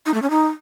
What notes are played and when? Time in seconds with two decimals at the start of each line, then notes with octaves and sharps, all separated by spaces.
0.06 D#4
0.14 A3
0.22 C#4
0.30 D#4